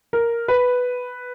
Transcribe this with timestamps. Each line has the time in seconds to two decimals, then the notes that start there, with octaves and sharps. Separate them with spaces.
0.13 A#4
0.48 B4